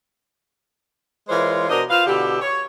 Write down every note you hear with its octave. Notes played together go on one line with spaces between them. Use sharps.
E3 G#3 F4 A#4 C5 C#5
B2 D4 A#4 C5 D#5
F4 B4 C5 F5
B2 D3 E4 G4
C#5